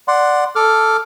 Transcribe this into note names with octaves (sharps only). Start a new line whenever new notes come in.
D5 F#5 C6
A4 D6 F6